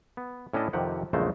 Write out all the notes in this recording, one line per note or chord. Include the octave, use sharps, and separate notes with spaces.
B3
A2 C#4 D4 E4 D#5 A5
F2 C3 D#3 G4 F#5
A#1 E2 C#3 G#3 A3 C5